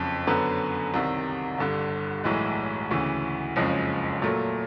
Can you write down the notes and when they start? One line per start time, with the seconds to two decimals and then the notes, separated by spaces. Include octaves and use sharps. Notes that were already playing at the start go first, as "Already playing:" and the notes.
Already playing: F#1 F2 C#3
0.27 F#2 D3 F#3 B3
0.94 C2 C3 D#3
1.58 G1 G2 D3
2.24 B1 A2 E3 G#3
2.91 D2 C#3 E3
3.56 F#1 F2 C#3 F3 G#3
4.22 A#2 F#3 A3